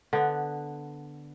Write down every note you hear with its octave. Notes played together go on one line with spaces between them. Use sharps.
D3 B3